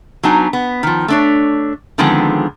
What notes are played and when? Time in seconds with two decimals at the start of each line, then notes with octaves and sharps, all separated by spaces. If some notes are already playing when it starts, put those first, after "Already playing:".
0.23 F#3 B3 D4 D#4 G#5
0.53 B3
0.83 D#3 F3
1.08 A3 D4 C#5
1.98 D3 D#3 F3 G#3 B3 C4